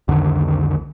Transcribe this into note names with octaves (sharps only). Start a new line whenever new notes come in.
C2 F2 D3 D#3